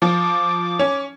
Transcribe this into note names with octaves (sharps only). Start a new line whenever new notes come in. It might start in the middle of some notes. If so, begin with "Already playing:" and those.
F3 D6
C#4